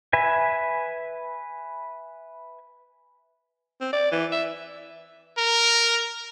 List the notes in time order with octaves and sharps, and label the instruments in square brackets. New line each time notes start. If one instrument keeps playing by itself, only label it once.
[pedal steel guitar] B4 E5 G#5
[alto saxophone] C4
D5
E3
E5
[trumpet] A#4